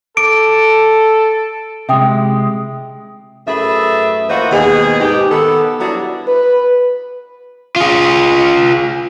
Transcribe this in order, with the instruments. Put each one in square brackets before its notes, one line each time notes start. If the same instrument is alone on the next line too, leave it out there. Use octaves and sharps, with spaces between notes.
[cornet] A4 [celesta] D6 [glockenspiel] D7
[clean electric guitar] C3 G#3 [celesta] E5 G5 D#6
[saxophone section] F#2 A3 G#4 B4 E5
E3 A#3 F4 F#4 C5 D#5
D#2 B2 G#3 G#4
G#2 B2 D#4 G4
D#3 B3 A4
F#3 G3 B3 D4 E4 F#4
[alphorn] B4
[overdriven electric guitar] F4 G#4